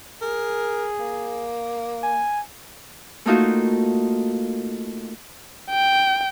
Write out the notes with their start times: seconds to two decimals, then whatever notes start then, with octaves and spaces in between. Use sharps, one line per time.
0.22 G#4 A#4
1.00 A#3
2.03 G#5
3.26 A3 A#3 D#4 F4 F#4
5.71 G5